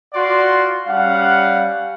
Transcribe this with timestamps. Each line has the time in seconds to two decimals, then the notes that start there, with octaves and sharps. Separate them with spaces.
0.14 F4 F#4 D5 F#5 C6
0.87 G3 C#4 F5 F#5